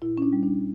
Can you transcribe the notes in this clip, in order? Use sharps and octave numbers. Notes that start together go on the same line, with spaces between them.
A#2 E4
C#4
D4
G3
D4